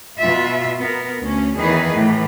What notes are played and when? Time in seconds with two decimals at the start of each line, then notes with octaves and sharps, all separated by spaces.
0.18 B2 F4 E5
0.80 B3 A#4
1.20 D2 C#4
1.57 E2 D#3 E3 G#4 B4
1.94 A2 E3